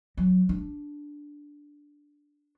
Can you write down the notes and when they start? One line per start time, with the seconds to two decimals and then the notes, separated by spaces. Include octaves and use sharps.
0.17 F#3
0.49 D4